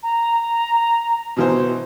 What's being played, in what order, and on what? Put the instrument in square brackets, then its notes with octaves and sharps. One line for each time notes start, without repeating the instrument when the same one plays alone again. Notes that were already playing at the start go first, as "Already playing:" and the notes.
[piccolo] A#5
[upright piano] B2 E3 C5